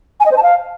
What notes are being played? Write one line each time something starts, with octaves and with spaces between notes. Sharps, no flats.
G#5
D#5
C5
A5
F5